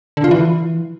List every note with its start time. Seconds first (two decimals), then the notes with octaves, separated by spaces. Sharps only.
0.17 D3
0.24 F4
0.31 E3